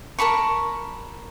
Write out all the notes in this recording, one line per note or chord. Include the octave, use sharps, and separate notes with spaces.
A#4 A5 B5 C#6